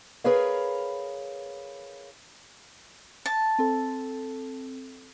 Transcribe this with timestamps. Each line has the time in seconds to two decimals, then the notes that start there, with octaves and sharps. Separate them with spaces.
0.24 G#4 A#4 B4 C#5 F5
3.26 A5
3.59 C4 A4